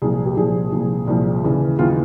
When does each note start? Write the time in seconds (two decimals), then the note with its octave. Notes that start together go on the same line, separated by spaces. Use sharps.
0.02 C2 A#2 F3 G#4
0.26 G4
0.37 C2 A#2 F3 G#4
0.72 C2 A#2 F3
1.07 C2 A#2 F3
1.43 D#2 C#3 E3
1.79 D#2 C#3 E3 F4
1.88 D#4